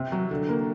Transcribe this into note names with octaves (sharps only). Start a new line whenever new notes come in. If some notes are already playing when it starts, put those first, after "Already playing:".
Already playing: C3
F#3
D3
A#3